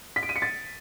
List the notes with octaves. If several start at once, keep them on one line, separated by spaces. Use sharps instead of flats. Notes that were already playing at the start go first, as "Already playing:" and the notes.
B6
D7
D#7
C#7
A6